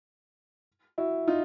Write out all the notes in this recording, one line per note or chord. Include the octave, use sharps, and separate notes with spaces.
E4 F#4
D#4 F4